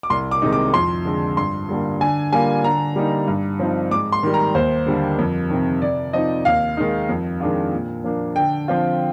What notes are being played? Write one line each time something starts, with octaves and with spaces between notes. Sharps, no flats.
D6
C2 C6
D6
C3 D#3 G#3 D#4
D6
F2 C6
D3 G#3
G2 C6
D3 G3 A#3
D3 G#5
G3 A#3 F4 G#5
D3 A#5
G3 A#3 D#4
G2
F3 C4 D#4
G#2 D6
C6
D#3 G3
A#5
D#2 C5
D3 G3 A#3
F2
C3 D#3
C3 D5
F3 C4 D#4 D#5
D#2 F5
D#3 G#3 D#4
F2
D#3 G#3 D4 F4
A#2
F3 A#3 D4
D3 G5
F3 C4 F4